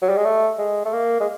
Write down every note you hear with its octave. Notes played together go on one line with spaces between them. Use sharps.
F#3
G3
G#3
A3
G#3
A3
A#3
G#3